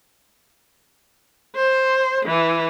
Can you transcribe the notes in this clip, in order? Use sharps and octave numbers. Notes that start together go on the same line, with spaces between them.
C5
E3